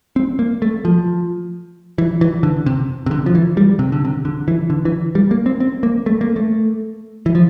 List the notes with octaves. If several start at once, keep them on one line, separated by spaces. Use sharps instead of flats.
C4
A#3
A3
F3
E3
E3
D3
C3
C3
D3
F3
E3
G3
C3
D3
C3
D3
E3
D3
E3
G3
A#3
C4
C4
A#3
A3
A#3
A3
E3
F3